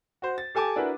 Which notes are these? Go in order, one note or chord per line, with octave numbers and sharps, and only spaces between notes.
F#4 C5
A6
G4 A4 G#5 A5 D6
D4 E4 F#4 A#4 B4